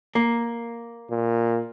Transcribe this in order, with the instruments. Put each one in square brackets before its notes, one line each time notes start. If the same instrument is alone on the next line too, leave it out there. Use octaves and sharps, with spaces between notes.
[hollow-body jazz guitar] A#3
[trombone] A#2